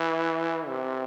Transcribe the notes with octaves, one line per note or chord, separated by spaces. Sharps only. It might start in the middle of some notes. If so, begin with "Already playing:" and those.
Already playing: E3
C3